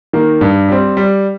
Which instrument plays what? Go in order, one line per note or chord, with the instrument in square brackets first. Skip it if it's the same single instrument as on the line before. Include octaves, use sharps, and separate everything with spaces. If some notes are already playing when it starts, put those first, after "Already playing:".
[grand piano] D#3 A#3
G2
G3 C4
G3